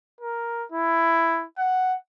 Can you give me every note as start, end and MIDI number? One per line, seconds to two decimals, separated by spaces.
0.21 0.65 70
0.72 1.45 64
1.58 1.95 78